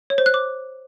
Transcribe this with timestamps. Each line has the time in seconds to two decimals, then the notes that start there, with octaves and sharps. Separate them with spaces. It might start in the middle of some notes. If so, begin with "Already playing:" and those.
0.10 C#5
0.18 C5
0.26 F#6
0.34 D6